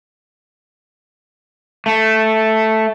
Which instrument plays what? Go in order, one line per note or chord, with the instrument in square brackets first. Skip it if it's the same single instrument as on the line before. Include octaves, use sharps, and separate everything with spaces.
[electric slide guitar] A3